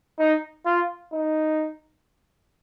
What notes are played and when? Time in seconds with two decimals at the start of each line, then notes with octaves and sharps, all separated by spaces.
0.19 D#4
0.65 F4
1.13 D#4